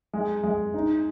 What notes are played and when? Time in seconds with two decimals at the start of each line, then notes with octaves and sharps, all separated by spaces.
0.13 G#3
0.44 G#3
0.74 D#4